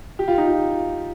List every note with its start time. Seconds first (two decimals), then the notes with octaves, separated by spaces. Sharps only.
0.19 G4
0.28 F4
0.38 D#4
0.47 F4